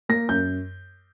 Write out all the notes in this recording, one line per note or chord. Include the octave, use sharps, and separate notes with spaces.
A#3 A#6
F#2 G6